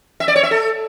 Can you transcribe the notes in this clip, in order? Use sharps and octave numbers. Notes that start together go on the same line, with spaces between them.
E5
D5
C#5
E5
A4